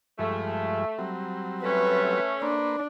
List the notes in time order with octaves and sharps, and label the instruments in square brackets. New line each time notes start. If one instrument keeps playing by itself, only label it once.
[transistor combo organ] G2 F3 G#3 [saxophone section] A3
[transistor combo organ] F#3 G3 C4
[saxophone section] A3 C#4 [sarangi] B4
[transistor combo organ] A#3 B4 C5 [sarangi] D4